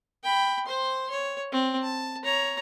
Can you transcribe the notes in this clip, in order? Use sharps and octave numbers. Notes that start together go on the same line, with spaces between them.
G5 B5
C5 C6
C#5
C4
A5
C#5 A#5